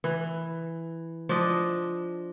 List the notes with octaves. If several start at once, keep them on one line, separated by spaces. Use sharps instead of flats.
E3
F3 D4 D#5